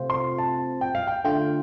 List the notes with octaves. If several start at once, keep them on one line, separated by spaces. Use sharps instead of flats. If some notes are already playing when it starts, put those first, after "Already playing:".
Already playing: C3 A3 C4 F4 C5
C6
A5
G5
F5
G5
D3 A3 F4 G5